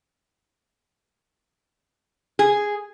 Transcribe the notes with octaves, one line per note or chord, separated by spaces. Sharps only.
G#4